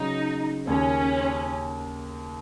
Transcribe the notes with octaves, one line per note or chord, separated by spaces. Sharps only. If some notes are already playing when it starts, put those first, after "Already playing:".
Already playing: C#3 F#3 C#4 D#4
D#2 C#3 A#3 C#4